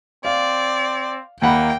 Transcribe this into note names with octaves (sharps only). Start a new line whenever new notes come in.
C4 D5 F5
D#2 A#3 F#5 G5 B5